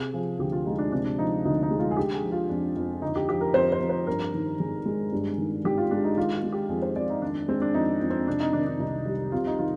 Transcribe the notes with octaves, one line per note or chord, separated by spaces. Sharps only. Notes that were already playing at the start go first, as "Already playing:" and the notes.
Already playing: C3 G#4
F3 G#4
D2 G4
F4
G#3 D#4
D4
C3 D4
D4
F3 D#4
D2 D#4
D#4
G#3
F4
G#4
D3 G4
G#4
F3
F4
F2 D4
F2
D3 D#4
G4
F3 G4
A#4
F2 C5
C5
F2
C5
G2 A#4
D#3
G#1 G#4
G#3
G2
D#3
G#1 G4
F4
G#3 D4
D#4
D#3 F4
F4
G#3
G4
F2 G#4
C5
F2 D5
D#4
D#3 D4
G#3 C4
D4
F2 D#4
F2
C4
C3 D4
D#4
D#3 D4
D4
C2 D#4
G3
C3 F4
D#4
D#3 F4